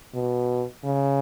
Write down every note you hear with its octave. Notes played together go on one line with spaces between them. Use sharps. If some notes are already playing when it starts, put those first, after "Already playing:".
B2
C#3